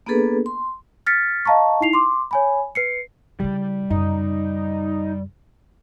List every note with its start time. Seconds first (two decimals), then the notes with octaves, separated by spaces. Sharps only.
0.06 A#3 B3 D4 G#4 A4 B4
0.46 C6
1.06 F6 A6 B6 C#7
1.45 D#5 F5 A5 A#5 C#6
1.81 D#4 E4 C7 F7
1.93 C6 D6
2.31 C#5 G#5 B5
2.75 B4 C7 C#7
3.40 C#3 G3 E4
3.90 F#2 C#3 D#4